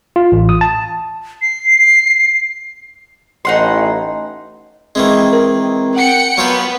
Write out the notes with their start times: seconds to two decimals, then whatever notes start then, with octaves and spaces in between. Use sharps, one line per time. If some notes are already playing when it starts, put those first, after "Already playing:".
0.16 F4
0.32 A1
0.49 D#6
0.61 A5
1.42 C7
3.45 A1 D#4 F#5 C6
4.95 D#3 E3 G#3 C4
5.33 A#4
5.96 F#5 G5 C#7
6.38 F#3 B3 F4 G5